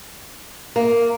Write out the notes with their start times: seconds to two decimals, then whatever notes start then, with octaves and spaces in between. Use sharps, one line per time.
0.76 A#3